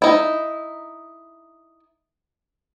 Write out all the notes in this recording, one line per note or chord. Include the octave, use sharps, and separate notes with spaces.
D#4 E4